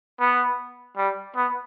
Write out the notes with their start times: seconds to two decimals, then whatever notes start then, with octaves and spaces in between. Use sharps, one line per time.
0.20 B3
0.97 G3
1.36 B3